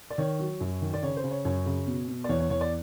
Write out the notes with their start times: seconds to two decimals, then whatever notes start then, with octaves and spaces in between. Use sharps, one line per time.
0.10 D5
0.18 D#3 C#5
0.39 F#3
0.60 F#2
0.81 D#3
0.94 D5
1.03 C#3 C#5
1.17 C5
1.24 C#3
1.31 C#5
1.45 F#2 C#5
1.66 C#3
1.87 B2
2.08 B2
2.24 D5
2.29 E2 C#5
2.40 C#5
2.50 E2 C#5
2.61 D5